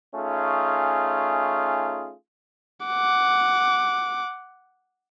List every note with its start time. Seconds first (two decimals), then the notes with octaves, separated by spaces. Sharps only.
0.15 A3 C#4 D#4 F4 G#4
2.86 F#5 D6